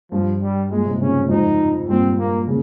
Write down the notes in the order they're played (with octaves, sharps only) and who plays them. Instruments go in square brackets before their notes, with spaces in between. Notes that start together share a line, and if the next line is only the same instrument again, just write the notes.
[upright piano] G2 [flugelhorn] F3
[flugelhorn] G3
[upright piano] G2 A#2 [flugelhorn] G#3
[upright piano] G#2 C3
[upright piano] A#2 C#3 [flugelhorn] C#4
[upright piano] A#2
[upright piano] F2 G#2 [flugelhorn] D#4
[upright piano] G2 A#2 [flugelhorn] C4
[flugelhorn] A#3
[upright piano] A#2 C#3